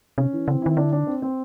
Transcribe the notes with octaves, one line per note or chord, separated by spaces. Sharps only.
C3 C#4
E3
C#3 C4
D#3 E4
D3 D4
D4
C4
C4